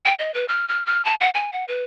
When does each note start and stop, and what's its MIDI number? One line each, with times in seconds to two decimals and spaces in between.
0.05 0.14 79
0.19 0.33 75
0.34 0.45 71
0.48 0.67 89
0.68 0.85 89
0.86 1.04 89
1.05 1.14 81
1.21 1.30 78
1.35 1.51 80
1.53 1.65 78
1.68 1.84 71